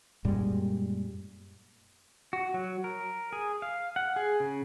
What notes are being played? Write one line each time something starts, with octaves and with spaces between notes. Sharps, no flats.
F#2 A#2 G3 G#3
F#4
F#3
A#4
G#4
F5
F#5
G#4
C#3